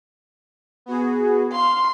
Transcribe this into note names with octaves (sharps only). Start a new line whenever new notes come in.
B3 F#4 G#4
F5 C6